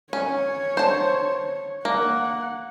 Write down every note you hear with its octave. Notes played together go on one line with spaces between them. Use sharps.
C#4 C#5
C5 A5
A#3 F#5